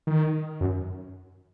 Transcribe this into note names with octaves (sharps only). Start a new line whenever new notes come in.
D#3
F#2